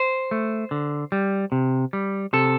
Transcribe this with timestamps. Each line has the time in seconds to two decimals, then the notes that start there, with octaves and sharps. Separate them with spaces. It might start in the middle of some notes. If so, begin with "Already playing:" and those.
Already playing: C5
0.31 A3
0.71 D3
1.12 G3
1.52 C3
1.93 G3
2.33 C3 A4